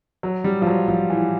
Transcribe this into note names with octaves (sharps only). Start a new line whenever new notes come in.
F#3
G3
F3
F#3
F3
E3